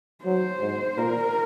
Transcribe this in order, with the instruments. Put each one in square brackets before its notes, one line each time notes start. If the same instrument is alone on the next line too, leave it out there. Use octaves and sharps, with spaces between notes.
[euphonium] F#3 [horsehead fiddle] C5
[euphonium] G#2
[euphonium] A#2 [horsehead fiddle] A#4